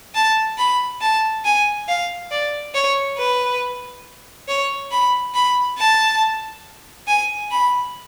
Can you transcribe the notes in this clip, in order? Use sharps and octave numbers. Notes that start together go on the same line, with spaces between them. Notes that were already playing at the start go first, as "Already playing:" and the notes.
A5
B5
A5
G#5
F5
D5
C#5
B4
C#5
B5
B5
A5
G#5
B5